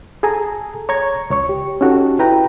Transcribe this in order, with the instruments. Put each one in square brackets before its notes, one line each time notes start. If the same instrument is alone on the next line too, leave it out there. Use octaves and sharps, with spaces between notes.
[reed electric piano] G#4 A4 G#5 A#5
C#5 A#5 C#6 G#6
C#2 C#5 C#6
G4
C#4 D#4 F#4 G4 A4
E4 B4 G5 A#5